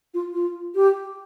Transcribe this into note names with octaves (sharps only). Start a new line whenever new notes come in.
F4
F4
G4